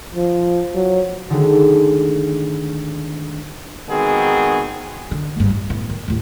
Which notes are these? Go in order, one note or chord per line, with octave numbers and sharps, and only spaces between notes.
F3
F#3
D3 D#3 G#3 A3
D#3 G#3 B3 C4 F#4 G#4
D3
F#1 G2
A1
A2 B3
D#3
D#2 A2